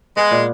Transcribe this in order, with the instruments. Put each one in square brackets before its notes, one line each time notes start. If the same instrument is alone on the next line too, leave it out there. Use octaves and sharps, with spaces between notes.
[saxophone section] G#3 [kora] B3
[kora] A#2